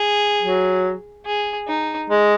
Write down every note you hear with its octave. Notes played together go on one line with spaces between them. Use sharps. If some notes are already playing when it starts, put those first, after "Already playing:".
Already playing: G#4
F#3
G#4
D#4
G#3